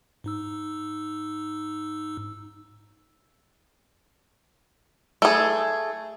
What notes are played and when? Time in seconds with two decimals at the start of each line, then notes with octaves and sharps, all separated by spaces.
0.24 G#2 D#4 E6
5.22 A3 G#4